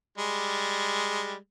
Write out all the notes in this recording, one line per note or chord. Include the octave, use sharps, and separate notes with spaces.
G3 G#3